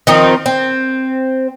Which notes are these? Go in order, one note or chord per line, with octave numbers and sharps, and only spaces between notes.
D#3 F3 C4 D#4
C4